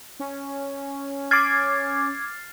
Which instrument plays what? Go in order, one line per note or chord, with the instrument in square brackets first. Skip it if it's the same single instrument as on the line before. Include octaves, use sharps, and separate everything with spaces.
[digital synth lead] C#4
[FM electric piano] D6 G#6 [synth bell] F6 A6 C7